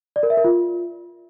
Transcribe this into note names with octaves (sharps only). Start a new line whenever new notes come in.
D5
A#4
E5
A#4
F4